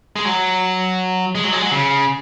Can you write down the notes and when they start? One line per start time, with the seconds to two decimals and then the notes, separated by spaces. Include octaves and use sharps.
0.16 G#3
0.25 F#3
1.35 G#3
1.44 F#3
1.53 G#3
1.62 F#3
1.71 C#3